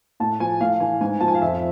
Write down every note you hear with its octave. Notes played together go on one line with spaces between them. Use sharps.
A2 A5
F3 G#5
A2 F5
E3 G#5
G#2 G#5
F3 A5
G#5
F5
F2 E5